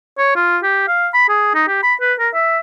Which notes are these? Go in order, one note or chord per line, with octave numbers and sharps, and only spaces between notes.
C#5
F4
G4
F5
B5
G#4
D#4
G4
B5
B4
A#4
E5